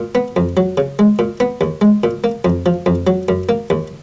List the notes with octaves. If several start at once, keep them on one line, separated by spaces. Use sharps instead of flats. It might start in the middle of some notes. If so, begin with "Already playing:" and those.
Already playing: A#2
B3
F2
F#3
C#3
G#3
A#2
B3
D#2
G#3
A#2
A#3
F2
F3
F2
F#3
F#2
A#3
D#2